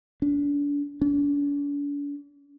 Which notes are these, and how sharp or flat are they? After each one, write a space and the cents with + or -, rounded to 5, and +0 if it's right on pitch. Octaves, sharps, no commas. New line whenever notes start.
D4 -35
D4 -45